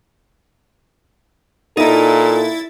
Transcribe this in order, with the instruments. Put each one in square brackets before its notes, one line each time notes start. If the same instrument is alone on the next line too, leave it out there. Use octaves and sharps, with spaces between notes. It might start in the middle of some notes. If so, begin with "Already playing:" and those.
[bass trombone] A#2 [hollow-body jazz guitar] D#4 [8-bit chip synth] E4 A6 [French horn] A4